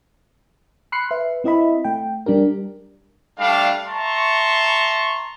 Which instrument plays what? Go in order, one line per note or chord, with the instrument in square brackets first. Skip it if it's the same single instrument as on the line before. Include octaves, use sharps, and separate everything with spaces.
[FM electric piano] B5 C6 F6 F#6 C7 C#7
B4 E5
C4 E4 D#5 E5 B5
A3 G5
G3 D4 G4 A#4
[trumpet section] G3 A3 D4 F5
E5 A5 A#5 C6 C#6